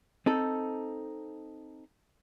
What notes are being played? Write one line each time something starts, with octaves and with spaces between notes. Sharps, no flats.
C4 D#4 A4